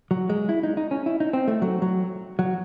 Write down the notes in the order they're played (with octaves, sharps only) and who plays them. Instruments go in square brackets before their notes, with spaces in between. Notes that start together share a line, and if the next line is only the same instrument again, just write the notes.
[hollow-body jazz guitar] F#3
G#3
E4
D#4
D#4
C#4
E4
D#4
C4
A3
F#3
F#3
F#3